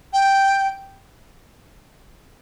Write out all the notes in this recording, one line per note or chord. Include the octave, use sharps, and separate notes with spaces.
G5